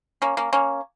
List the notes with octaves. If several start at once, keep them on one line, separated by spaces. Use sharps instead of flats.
A#3 C#4
A#3 C#4
A#3 C#4